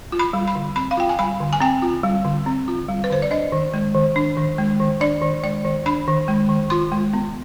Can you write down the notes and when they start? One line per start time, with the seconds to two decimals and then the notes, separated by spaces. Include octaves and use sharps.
0.12 F4
0.19 B5
0.33 G3
0.48 B5
0.55 D3
0.76 C4 B5
0.91 F5
0.97 F4 G5
1.09 G#5
1.19 G3 B5
1.40 D3
1.53 G#5
1.60 C4 G5
1.82 F4
2.03 G3
2.25 D3
2.46 C4
2.68 F4
2.88 G3
3.04 B4
3.10 D3 C5
3.22 D5
3.31 D4 D#5
3.52 D#3
3.74 G#3
3.95 D#3
4.16 D4
4.37 D#3
4.58 G#3
4.80 D#3
5.01 D4 D5
5.22 D#3
5.44 G#3 D5
5.65 D#3
5.86 D4 B5
6.08 D#3
6.28 G#3
6.49 D#3
6.70 F4 C6
6.92 G#3
7.13 B3